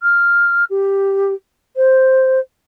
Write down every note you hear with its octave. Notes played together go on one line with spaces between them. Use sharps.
F6
G4
C5